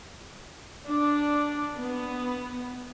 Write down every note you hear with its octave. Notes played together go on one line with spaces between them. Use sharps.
D4
B3